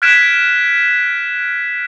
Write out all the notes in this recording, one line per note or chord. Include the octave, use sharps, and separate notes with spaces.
F6 F#6 G#6 B6 D7 E7